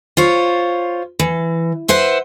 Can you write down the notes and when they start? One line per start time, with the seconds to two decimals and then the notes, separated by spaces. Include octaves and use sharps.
0.17 F4 C5 C#5
1.19 E3
1.88 B4 C5 E5 F#5